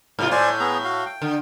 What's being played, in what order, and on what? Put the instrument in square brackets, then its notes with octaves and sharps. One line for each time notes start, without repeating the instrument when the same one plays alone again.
[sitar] G#2 C3 F4
[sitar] A2 [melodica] C5 D5 G#5
[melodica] B3 G#4 A#5
F#4 F5
G5
[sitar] D3